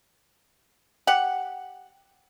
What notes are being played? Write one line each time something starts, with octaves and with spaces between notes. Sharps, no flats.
G4 F#5